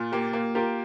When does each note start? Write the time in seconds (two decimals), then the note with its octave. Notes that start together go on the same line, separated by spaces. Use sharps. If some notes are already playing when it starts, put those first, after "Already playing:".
Already playing: A#2 F4
0.12 A#3 G4
0.33 A#3
0.55 F4 G4 A#4